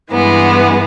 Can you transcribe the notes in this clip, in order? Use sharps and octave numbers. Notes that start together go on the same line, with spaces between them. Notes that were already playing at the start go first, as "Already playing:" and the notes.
G2 E3 G#3 B3